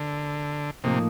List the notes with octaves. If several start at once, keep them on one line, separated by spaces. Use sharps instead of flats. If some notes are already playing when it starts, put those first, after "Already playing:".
Already playing: D3
A2 C3 F3 A#3 D#4